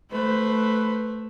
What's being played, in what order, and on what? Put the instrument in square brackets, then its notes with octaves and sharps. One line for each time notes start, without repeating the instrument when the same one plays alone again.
[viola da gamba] A3 [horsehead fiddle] B4 C5